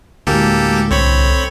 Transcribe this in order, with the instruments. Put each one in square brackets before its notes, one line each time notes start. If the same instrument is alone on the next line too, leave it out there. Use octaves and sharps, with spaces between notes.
[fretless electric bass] D2 A2 [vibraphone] G#3 F#4 [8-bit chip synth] A#3 G4 A4
[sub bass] C2 [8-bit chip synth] C4 C#5 B5 [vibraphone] A4